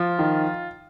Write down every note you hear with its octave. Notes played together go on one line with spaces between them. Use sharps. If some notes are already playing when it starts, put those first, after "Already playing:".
Already playing: F3 F4
D#3